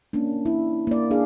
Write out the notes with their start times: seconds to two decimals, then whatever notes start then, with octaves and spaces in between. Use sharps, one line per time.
0.13 A#3 C#4 D4
0.45 E4
0.87 A#3 D5
1.11 D4 G#4 F5